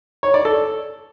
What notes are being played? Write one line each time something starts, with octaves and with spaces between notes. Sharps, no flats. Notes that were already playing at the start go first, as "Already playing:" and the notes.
C#5
D5
A4